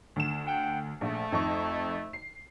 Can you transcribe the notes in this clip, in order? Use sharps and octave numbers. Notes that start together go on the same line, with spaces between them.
D2 E7
F#5 G5
A#1 A3
F2 D#4 C#6
C7